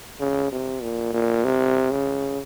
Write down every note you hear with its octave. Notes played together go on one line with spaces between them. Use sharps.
C#3
C3
A#2
A#2
C3
C#3